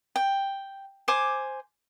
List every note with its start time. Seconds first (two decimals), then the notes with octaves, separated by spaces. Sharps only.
0.16 G5
1.08 C5 G#5 D6